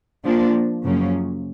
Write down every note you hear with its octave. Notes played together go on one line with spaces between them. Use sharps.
F3 A#3 D4
F#2 C#3 F3 A#3 C#4